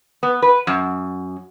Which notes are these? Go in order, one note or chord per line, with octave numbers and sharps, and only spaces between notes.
B3
B4
F#2